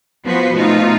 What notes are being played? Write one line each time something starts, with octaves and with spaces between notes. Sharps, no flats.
F3 B3 F#4 B4 C5
B2 A3 D#4 F4